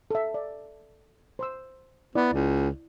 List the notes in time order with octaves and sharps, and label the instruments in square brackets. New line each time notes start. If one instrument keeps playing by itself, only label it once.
[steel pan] A4 E5
D5
C5 C6 E6
[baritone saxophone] B3 [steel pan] E4 D5
[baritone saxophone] C#2